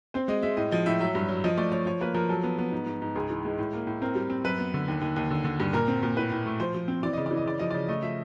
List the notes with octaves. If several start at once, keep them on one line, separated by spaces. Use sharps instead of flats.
C4 C5
G#3 D#5
G#3 E5
A2 D#5
F3 D#5
A2 E5
F#3 E5
G2
F#3
F3 D#5
A3 D5
F3 C#5
F3 C#5
A#3 B4
F3 A#4
F#3 A4
B3
B3
G#2
G#2
G#2
C#2 G#4
E3
G#3
A2
A#3
A2
C4 A#4
G3
C4
F#2 B4
B3
D3
D#2
D#2
D#2
D3
D3
G2
A#2 A#4
C4
A#2
A2 B4
A2
A3
F3 C5
F3
C4
E3 D5
C#3 D#5
E3 D5
D#5
C#3 D5
F3 D#5
C#3 D5
A3 D#5
F3 E5